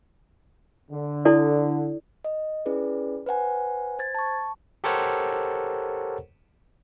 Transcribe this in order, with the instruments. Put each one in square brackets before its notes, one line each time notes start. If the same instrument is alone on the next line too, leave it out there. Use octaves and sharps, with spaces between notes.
[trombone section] D3
[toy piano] E4 A4 D5
[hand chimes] D#5
C#4 E4 G#4 B4 D5
B4 C5 F#5 G#5
C5 G#6 A6
A5 C#6
[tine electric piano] G4 A4 A#4 C5 C#5 F#5